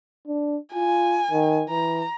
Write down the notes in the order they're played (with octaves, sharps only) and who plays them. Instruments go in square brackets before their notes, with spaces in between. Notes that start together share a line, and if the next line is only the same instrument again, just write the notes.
[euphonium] D4
[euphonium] F4 [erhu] G#5
[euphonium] D#3
[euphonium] E3 [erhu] A#5